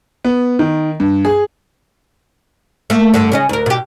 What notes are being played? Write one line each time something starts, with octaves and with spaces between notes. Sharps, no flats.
B3
D#3
G2
G#4
A3 A#3
G2 D3
C#3 C#4 D#5
D2 A#4
B2 G4